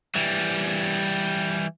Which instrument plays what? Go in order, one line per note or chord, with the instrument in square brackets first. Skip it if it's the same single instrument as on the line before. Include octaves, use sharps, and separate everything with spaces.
[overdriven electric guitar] E3 G3